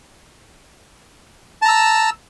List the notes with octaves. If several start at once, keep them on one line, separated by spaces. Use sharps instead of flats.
A5 A#5 E6